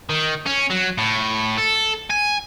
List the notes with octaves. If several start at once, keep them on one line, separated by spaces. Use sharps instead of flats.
D#3
C#4
F#3
A2
A4
G#5